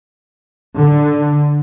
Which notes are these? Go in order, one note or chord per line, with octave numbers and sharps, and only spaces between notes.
D3